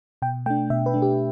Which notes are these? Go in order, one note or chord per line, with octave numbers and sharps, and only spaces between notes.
B2 G5
A3 D4 G5
B2 E5
B4
A3 D4
G4